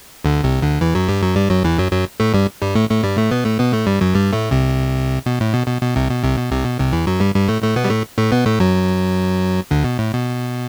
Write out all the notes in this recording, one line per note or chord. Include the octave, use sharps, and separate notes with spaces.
D2 D3
C2 C3
D2 D3
E2 E3
F#2 F#3
G2 G3
F#2 F#3
G2 G3
F#2 F#3
E2 E3
F#2 F#3
F#2 F#3
A2 A3
G2 G3
G2 G3
A2 A3
A2 A3
G2 G3
A2 A3
B2 B3
A2 A3
B2 B3
A2 A3
G2 G3
F#2 F#3
G2 G3
A2 A3
C2 C3
B2
A2
B2
B2
B2
C2 C3
B2
C2 C3
B2
C2 C3
B2
C2 C3
E2 E3
F#2 F#3
G2 G3
G2 G3
A2 A3
A2 A3
B2 B3
G3
A2 A3
A2 A3
B2 B3
A2 A3
F#2 F#3
D2 D3
B2
A2
B2